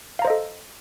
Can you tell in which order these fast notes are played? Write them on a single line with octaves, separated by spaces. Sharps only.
F5 A#5 C5 D#5 A4